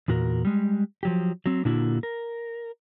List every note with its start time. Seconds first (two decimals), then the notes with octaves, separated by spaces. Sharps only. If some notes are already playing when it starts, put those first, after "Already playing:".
0.08 E2 A#2 F#4 A#4
0.45 G3 G#3
1.03 F3 F#3 G4
1.46 F#3 C4
1.65 A#2 D3 A#3 D4 E4 F#4
2.03 A#4